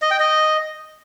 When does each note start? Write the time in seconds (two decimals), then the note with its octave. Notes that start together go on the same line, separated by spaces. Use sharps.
0.02 D#5
0.11 G5
0.20 D#5